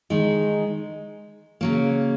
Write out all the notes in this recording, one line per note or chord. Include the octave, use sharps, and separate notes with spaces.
D#3 G#3 D#4 G#4
C#3 F#3 A#3